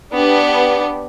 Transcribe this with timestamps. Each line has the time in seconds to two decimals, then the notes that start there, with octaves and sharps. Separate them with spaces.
0.13 B3 D4 G4